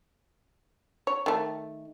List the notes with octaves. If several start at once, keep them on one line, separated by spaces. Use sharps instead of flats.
C#5
D#3 A3